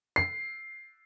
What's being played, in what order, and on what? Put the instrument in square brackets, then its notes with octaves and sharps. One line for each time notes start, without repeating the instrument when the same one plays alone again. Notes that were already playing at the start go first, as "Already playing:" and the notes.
[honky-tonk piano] C7